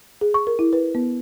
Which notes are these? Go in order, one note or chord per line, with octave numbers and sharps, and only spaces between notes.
G#4
C#6
A#4
E4
B4
B3